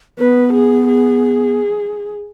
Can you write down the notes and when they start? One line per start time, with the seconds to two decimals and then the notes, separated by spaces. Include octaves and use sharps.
0.19 B3 B4
0.53 G#4
0.88 G#4